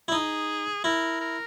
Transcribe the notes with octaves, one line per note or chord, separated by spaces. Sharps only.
E4
D#4 G#4
E4 A#4
A#4